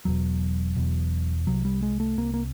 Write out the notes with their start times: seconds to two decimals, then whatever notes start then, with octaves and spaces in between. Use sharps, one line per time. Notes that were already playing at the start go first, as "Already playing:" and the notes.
0.05 E1 E2 B2 F#3
0.76 E1 E2 B2
1.47 C2 C3 F#3
1.65 G3
1.83 G#3
2.00 A3
2.18 C2 C3 A#3
2.34 A#3